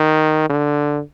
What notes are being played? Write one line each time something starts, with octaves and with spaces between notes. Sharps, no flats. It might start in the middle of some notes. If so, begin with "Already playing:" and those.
Already playing: D#3
D3